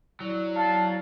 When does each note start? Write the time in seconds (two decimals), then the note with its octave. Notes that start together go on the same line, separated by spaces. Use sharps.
0.20 F#3 E4 D5
0.55 F5 A5